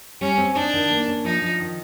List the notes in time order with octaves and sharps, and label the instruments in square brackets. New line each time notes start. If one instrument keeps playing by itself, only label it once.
[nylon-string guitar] G3 [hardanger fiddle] C#4
[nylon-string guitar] C4
[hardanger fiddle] D4 [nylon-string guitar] D#4
[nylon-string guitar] D#3
A#3
C#4
[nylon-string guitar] F3 [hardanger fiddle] D#4
[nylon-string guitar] F3
D#3